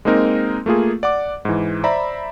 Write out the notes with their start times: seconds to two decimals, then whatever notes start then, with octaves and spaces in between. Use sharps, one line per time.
0.05 G#3 A#3 C4 D#4 A#4
0.66 A3 A#3 F4 G#4
1.03 D5 F#5 D6
1.45 G#2 E3
1.84 C5 D5 E5 A#5 B5